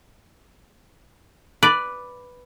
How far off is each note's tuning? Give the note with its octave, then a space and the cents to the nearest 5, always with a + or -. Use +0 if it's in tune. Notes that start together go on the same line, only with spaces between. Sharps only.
B4 +0 D5 +0